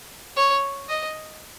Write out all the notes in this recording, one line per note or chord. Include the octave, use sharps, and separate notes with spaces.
C#5
D#5